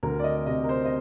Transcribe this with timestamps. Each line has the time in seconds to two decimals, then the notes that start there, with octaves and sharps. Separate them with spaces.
0.03 D2 A#4
0.19 D5
0.24 D#5
0.46 C3 D#5
0.64 A#4
0.69 C5
0.85 D#5